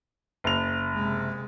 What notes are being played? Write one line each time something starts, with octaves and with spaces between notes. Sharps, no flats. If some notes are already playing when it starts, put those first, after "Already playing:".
F#1 F7
C3 G#3